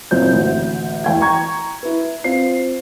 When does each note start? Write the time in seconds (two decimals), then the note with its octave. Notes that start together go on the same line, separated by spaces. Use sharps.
0.11 F#1 A#2 C4 G6
0.33 A1 D2
1.04 E2 G5 G#6
1.21 A#5 C#6 G#6
1.83 E4 B4
2.24 C4 F4 C7